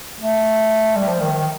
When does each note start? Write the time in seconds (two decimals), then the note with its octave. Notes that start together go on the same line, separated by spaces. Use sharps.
0.19 A3
0.95 G3
1.08 F3
1.20 D#3
1.33 D#3